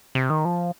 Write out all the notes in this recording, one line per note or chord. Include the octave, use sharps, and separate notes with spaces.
C3
D#3
F3